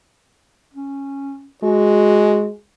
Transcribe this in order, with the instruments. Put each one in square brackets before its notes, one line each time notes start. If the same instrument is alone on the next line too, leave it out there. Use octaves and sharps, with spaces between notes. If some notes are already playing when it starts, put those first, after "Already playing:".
[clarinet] C#4
[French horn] G#3 [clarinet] F#4